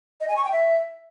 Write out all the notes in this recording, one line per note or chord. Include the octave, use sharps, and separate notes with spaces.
D#5
G#5
C#6
G5
E5